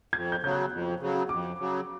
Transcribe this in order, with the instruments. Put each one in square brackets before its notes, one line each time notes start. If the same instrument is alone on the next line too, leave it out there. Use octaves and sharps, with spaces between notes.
[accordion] F2 [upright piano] G#6
[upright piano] G6
[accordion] C#3 F#3 [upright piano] G6
[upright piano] F#6
[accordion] F2
C#3 F#3
[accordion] F2 [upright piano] D6
[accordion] C#3 F#3